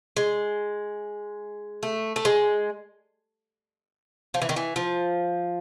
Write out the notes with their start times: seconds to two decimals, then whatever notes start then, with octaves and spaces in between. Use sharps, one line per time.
0.16 G#3
1.83 A3
2.16 A3
2.25 G#3
4.34 F3
4.42 E3
4.49 D#3
4.56 E3
4.76 F3